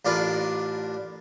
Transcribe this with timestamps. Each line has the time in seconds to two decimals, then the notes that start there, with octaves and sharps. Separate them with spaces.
0.05 A1 D4 F4 A#4 B4